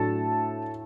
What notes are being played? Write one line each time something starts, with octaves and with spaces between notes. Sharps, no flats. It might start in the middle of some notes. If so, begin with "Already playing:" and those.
Already playing: A2 F#3 A3 D4 A4 A5